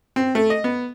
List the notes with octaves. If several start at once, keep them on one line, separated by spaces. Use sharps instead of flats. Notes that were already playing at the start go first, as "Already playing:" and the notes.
C4
A3
D#5
B3